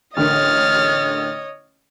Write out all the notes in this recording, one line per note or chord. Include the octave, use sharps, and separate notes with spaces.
A1 D3 A#4 C#5 D#5 F6 A6